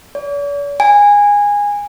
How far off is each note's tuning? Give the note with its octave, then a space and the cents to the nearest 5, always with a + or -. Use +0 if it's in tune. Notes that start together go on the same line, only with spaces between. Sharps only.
D5 -45
G#5 -20